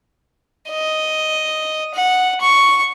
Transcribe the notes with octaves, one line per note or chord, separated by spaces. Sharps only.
D#5
F#5
C#6